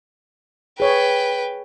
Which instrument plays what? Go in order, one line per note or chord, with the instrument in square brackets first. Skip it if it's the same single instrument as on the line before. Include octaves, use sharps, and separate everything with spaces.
[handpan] G#4 C#5 [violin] B4 G5